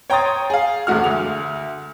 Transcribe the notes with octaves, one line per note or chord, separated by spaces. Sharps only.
C#5 G5 A#5 C6 D#6 A6
G#4 F5
E1 G#3 A3 F#4 F6
D2 F7